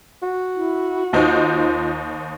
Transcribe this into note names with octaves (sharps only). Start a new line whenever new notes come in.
F#4
E4
D#2 D#4 F4 C5